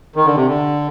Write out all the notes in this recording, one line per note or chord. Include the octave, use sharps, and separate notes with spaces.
D#3
D3
C3
D3